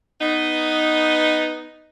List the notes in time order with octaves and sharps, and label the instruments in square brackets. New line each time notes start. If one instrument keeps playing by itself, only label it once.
[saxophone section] B3 D#4